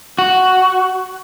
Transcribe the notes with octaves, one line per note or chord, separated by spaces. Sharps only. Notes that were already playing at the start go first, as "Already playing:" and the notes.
F#4